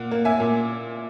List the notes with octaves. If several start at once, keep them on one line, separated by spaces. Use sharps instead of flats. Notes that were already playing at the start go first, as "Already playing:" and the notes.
Already playing: A#2 F#5
A#3
E5 G#5
A#2